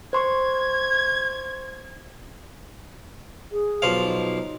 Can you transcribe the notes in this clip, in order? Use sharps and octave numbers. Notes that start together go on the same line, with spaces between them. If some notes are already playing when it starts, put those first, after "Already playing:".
C5 C6 C#6 G#6
G#4
B1 F3 F5
D#4